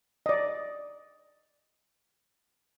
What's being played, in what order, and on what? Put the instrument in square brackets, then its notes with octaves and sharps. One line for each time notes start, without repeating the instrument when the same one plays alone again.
[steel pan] D5 D#5